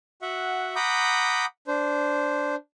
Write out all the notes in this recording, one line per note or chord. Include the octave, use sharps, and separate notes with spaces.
F#4 E5 F#5
F#5 A#5 B5 D6 D#6 G6
D4 C5